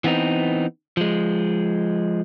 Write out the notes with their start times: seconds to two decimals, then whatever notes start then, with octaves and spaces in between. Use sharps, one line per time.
0.04 E3 B3 C4 D#4
0.97 F3 G#3